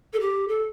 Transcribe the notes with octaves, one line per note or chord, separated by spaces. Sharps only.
A4
G4
A4